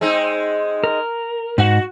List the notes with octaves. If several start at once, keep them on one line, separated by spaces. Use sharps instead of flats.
G#3 C4 D#4
A#4
G#2 F#4 F#5